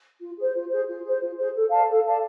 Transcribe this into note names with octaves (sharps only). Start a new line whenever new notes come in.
F4
G#4 C5
F4
G#4 C5
F4
G#4 C5
F4
G#4 C5
A4
D5 F5 A5
A4
D5 F5 A5